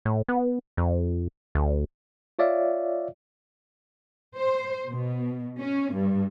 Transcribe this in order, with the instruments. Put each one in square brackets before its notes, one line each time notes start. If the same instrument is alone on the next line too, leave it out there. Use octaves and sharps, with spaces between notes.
[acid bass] A2
B3
F2
D2
[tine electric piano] F4 C#5 D5 E5 F5
[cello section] C5
B2
C#4
G2